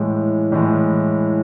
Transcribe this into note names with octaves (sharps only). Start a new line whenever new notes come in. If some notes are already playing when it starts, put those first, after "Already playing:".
Already playing: A2 E3 G#3
A2 E3 G#3